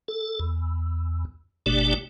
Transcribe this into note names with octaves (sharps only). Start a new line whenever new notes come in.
A4
E2
G1 B2 A3 D4 G4 D5